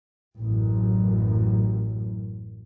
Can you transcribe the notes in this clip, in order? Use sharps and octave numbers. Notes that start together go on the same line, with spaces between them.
A1 F#2